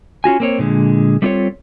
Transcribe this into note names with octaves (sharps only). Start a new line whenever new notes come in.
C#4 F4 F#4 G#5
A#3 C4 C#5
A#2 D3 G#3
G3 A3 C4 F4 A4 C#5